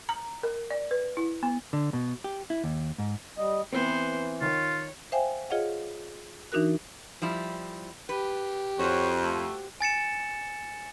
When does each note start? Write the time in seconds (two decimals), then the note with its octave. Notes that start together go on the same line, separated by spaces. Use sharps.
0.09 A#5
0.43 A#4
0.71 D5
0.91 B4
1.17 E4
1.43 B3
1.73 D3
1.93 B2
2.24 G4
2.50 E4
2.64 D#2
2.98 G#2
3.38 G3 D#5
3.73 E3 B3 C4 C5
4.41 D#3 F4 C#5
5.12 C5 E5 F5 G5 G#5
5.50 F4 G#4 C#5 D#5 F5 F#5
6.52 E3 D4 D#4 F#4 A#4 F#6
7.22 F3 G3 E4
8.09 G4 B4
8.79 F2 F#4 C5 C#5
9.22 A3
9.81 G#5 A6 C#7 E7